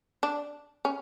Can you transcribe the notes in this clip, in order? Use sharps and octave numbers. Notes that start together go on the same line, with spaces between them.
D4
C#4